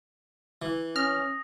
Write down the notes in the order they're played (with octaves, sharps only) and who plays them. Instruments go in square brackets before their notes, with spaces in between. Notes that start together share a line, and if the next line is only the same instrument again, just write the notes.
[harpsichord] E3
[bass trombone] C#4 [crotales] D#6 A#6 [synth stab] F6